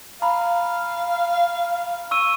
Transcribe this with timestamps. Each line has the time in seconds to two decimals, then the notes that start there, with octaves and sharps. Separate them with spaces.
0.22 F5 A#5 B5
2.11 C#6 E6 D#7